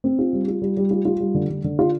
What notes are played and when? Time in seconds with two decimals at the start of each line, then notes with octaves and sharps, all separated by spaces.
0.04 C4
0.19 F4
0.33 G3
0.48 F4
0.62 G3
0.77 G3
0.91 F4
1.05 F4
1.20 G3
1.34 D3
1.50 D3
1.64 D3
1.79 F4